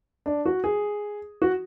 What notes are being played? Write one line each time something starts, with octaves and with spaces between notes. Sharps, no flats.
D4
F#4
G#4
F#4